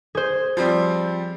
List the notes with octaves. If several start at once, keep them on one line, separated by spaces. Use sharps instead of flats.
G#4 C5
F3 G3 C4